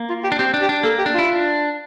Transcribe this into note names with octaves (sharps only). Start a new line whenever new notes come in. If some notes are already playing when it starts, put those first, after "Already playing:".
Already playing: A#3
F4
G4
D4
C4 G4
D4
G4
D4
A#3 A4
G4
D4
E4 F4
D4